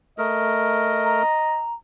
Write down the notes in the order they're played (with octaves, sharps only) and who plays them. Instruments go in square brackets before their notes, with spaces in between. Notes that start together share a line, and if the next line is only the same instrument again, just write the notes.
[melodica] A3 A#4 [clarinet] D#5
[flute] A#5